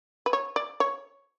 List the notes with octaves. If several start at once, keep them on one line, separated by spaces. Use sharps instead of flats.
B4
C#5
D5
C#5